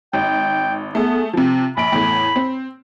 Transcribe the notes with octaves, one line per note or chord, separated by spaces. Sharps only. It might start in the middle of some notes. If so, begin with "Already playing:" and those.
G#1 G5
A3 B3 G#4 A4
C3 F3 C4
A#1 B5 D7
E2 A2
C4